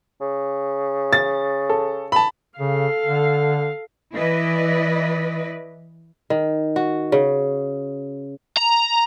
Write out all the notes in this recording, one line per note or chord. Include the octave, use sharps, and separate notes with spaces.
C#3
A6
A4
A5 B5
C#3 A4 F5
D3
E3 E4 B4 D5 D#5
D#3
F#4
C#3
A#5